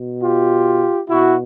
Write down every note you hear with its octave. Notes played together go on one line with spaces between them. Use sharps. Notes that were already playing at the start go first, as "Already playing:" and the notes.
Already playing: B2
F4 G4
B2 E4 F#4